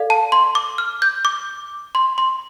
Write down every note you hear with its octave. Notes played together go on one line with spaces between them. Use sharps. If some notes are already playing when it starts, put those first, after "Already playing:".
Already playing: A4 D5 F5
A5
C6
D6
F6
G6
D6
C6
C6